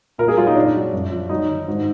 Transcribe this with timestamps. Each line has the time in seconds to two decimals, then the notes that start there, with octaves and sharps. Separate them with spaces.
0.18 A#2 A#4
0.28 G#4
0.37 F#3 F4
0.47 D#4
0.55 A#2 D4
0.75 F#3
0.93 F#2
1.11 F3
1.29 F#3 D#4
1.48 D#3
1.68 G#2